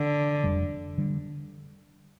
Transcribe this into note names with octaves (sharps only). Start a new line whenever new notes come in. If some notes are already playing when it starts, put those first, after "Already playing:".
Already playing: D3
F1 F2 D3 G3
D3 G3